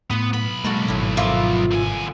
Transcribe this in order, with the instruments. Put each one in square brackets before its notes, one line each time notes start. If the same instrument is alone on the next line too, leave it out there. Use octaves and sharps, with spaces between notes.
[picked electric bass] A2 [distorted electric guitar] B3 [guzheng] F#5 C6
[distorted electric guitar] B1 B5 [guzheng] B3
[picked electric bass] G#3 A#3 [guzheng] F#4 A4 A#4
[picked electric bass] G#1 [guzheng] A2 E4
[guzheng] F2 A#3 A#4 [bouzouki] F4 E5
[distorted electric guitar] D3 G#5